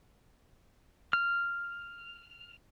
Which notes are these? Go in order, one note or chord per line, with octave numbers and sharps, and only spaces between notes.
F6